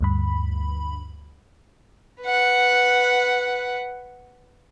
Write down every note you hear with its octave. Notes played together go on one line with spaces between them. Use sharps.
D2 G2 B5
B4 F#5